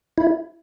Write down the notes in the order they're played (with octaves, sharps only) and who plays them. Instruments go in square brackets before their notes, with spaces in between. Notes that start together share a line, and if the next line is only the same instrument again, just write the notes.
[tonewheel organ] E4